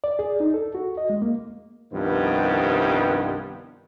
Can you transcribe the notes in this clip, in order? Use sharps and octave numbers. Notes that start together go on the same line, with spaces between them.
D5
G#4
D#4
A4
F#4
D#5
G#3
A#3
C2 G2 D#3 F3 B3 C4